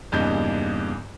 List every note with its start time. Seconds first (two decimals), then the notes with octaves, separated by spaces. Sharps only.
0.12 E2 G2 A#2 C#3 D#4 G6